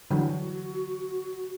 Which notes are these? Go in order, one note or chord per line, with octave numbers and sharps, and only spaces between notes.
D3 E3 F#3 F#4